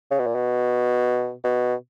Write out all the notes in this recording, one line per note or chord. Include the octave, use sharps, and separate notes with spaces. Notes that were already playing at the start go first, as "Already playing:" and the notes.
C#3
B2
A#2
B2
B2